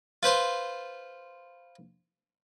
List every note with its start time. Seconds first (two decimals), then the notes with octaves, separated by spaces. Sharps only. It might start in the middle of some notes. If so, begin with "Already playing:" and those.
0.23 F4 B4 C5 C6